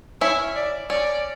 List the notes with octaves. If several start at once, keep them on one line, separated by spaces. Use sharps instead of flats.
C#4 E4 E5
D5
C#4 D5